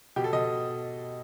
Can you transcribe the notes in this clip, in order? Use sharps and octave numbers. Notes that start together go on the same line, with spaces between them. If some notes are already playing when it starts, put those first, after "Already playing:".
B2 G4
A4
B2 D#5